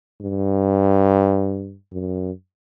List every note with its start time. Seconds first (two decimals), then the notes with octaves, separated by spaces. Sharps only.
0.21 G2
1.92 F#2